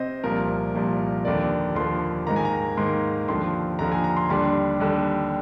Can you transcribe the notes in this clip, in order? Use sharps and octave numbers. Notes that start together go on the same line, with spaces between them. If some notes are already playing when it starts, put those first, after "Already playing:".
Already playing: C3 C4 C5 D#5
C2 A#2 F3 A#4
C2 A#2 F3
D#2 D3 F3 A#3 D5
D#2 D3 F3 A#3 C6
G#2 D#3 A#3 A#5
G#5
A#5
G#2 D#3 A#3 C6
D#2 D3 F3 C6
D#2 D3 F3 A#5
G#5
A#5
C6
D#2 D3 G3 D4 C6
D#2 D3 G3 D4